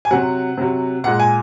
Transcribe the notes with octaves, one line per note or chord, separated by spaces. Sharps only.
G#5
C3 F#3 F#5
C3 F#3
A#2 G#3 F#5
G#5